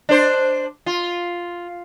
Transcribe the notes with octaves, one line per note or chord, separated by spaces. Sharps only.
D4 C5
F4